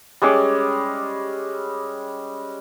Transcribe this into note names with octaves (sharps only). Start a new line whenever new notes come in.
G3 G#3 C#4 D6